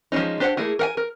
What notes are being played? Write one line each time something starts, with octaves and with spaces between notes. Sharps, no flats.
F3 G#3 A#3 C#4 D#4
D4 G4 C5 F5 F#5
A3 A#3 E4 G#4
A#4 F#5 G#5
A#4